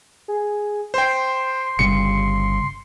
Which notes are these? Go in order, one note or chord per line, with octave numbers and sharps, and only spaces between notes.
G#4
C5 G5 C6
G1 C#3 G3 C#7